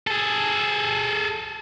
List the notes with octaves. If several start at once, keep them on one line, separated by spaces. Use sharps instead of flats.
G#4 A4